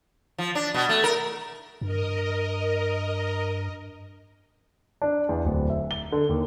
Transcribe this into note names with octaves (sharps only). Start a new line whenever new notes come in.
F3
D4
B2
A3
A#4
G2 A#4 D#5
D4
E2
D1
E5
G7
D3
D#2